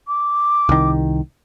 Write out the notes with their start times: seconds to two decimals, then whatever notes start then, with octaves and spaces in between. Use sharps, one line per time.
0.08 D6
0.69 C2 D#3